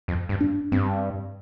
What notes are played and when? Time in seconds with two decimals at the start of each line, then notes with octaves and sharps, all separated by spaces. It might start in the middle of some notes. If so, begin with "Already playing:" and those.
0.08 F2
0.29 G2
0.41 D4
0.72 G2 C4